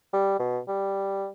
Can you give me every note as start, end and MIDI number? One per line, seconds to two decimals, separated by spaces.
0.13 0.39 55
0.39 0.59 47
0.68 1.28 55